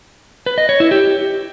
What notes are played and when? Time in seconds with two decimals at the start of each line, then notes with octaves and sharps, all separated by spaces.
0.46 B4
0.58 D#5
0.69 C#5
0.80 E4
0.91 G4